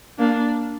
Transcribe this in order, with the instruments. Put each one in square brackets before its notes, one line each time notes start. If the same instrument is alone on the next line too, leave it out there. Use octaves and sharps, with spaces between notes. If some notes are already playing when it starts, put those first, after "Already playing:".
[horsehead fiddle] A#3 [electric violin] D4